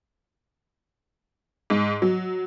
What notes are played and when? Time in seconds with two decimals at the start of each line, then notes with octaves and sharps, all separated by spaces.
1.70 G#2
2.02 F#3